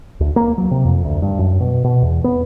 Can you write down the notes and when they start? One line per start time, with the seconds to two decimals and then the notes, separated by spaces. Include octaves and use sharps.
0.20 D2
0.36 A#3
0.58 F#3
0.71 C3
0.85 F2
1.05 D2
1.22 G2
1.39 F#2
1.60 B2
1.84 B2
2.02 E2
2.24 B3